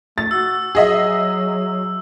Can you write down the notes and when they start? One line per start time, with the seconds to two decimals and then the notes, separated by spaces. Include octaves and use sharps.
0.18 A3 A6
0.31 F#4 E6
0.75 F#3 G#4 D#5 E5